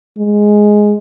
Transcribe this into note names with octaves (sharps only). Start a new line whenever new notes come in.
G#3